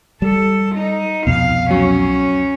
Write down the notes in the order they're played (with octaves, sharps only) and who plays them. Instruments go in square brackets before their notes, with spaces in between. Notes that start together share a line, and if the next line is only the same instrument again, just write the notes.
[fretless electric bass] G3 [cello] A4
[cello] D#4
[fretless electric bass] C2 F2 B2 [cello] F5
[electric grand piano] F#3 [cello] C#4